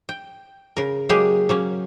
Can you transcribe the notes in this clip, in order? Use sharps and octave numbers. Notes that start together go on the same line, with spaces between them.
G5
C#3 A#4
F#3 G#3 A#3 G4 G#4
F#3 A#3 C#4